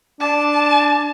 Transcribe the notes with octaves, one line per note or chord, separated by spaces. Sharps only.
D4 A5